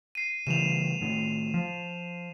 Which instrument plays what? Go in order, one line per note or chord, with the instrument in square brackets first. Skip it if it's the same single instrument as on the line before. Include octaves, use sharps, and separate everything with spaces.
[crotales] C7 D#7
[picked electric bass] C#3 E3 G3 [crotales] E7 F7
[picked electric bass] A2 D#3
F3